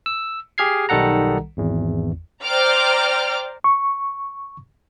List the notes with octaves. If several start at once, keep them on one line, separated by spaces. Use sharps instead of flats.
E6
G4 G#4 F6 G#6 C7
B1 D#3 G3 A4 F#5 A#5
G#1 E2
C5 D5 G5 A#5 D6 F6
C#6